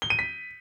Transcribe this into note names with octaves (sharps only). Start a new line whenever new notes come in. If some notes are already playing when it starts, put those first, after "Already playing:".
G7
D#7
B6